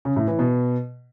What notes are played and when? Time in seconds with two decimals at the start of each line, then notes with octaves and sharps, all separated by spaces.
0.05 C#3
0.16 A2
0.28 E3
0.39 B2